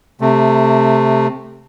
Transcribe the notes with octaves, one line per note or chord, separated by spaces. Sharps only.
C3 A3